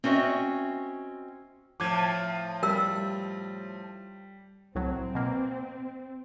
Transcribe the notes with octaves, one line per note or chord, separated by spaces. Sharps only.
C4 C#4 F#4 C#5 D#5 E5
A2 F3 D6 G#6
G3 A#4 E6
C2 A2 F#3 C4
B2 A#3